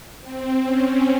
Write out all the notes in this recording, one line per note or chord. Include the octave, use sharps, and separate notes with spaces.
C4
C#4